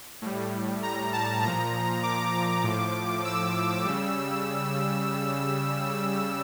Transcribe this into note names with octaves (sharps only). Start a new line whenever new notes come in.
A2 G3
A#5
A5
A#2 F3 A#5
D6
A2 F3
E6
C#3 G3